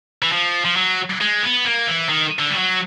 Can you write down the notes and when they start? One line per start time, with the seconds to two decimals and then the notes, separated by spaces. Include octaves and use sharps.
0.22 E3
0.32 F3
0.65 F3
0.76 F#3
1.21 G#3
1.43 B3
1.66 A#3
1.87 E3
2.10 D#3
2.39 D3
2.51 G3
2.55 F#3